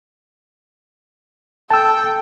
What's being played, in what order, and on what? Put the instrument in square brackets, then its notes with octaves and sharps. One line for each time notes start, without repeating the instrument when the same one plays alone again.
[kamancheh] A4 G5 [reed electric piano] A5 E6